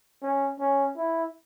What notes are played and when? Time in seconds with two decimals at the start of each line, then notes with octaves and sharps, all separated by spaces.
0.23 C#4
0.60 C#4
0.97 E4